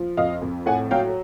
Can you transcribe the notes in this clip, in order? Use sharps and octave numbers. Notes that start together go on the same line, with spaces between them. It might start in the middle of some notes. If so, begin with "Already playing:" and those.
Already playing: F3
F2 D#5 F5
F2
A2 F#5 G#5
F#3 F5 G5